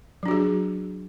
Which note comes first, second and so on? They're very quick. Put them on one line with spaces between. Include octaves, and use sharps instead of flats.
F#3 D4 F#4 G#4